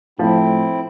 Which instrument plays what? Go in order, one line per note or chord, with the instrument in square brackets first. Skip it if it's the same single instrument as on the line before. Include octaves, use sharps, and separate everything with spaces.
[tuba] A2 [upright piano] F3 [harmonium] C4 E4